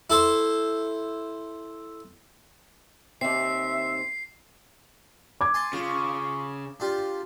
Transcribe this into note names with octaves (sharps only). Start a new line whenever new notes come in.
E4 A4 C5
D#2 C4 E5 C7
D6 G#6
G#5 A5 C6
C#3 F4
D4 F4 G4